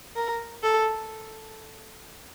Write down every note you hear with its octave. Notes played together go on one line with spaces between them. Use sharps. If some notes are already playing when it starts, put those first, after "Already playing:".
A#4
A4